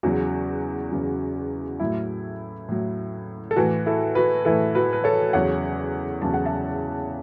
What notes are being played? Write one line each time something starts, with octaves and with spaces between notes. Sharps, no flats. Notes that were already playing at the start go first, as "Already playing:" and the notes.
E2 C#3 F#3 F#4
E2 C#3 F#3
A2 F#3 E4
A2 F#3
A4
A2 E3 F#4
E4 A4
F#4 B4
A2 E3 E4 A4
F#4 B4
B4
A4 C#5
E2 C#3 F#3 C#5 F#5
E2 C#3 F#3 A5
F#5
E5 A5